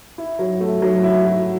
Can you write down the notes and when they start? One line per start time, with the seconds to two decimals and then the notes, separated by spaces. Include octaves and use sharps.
0.18 E4
0.39 F#3
0.61 A3
0.82 F#3
1.03 E4
1.25 F#3